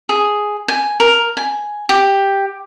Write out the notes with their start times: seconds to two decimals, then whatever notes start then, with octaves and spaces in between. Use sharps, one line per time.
0.09 G#4
0.68 G#5
1.00 A#4
1.37 G#5
1.89 G4